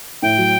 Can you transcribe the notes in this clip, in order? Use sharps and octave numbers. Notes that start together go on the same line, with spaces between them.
A2 G5
F#3